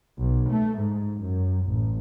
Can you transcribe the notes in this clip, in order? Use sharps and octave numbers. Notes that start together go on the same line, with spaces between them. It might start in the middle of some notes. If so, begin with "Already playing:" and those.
B1
A3
G#2
F#2
A1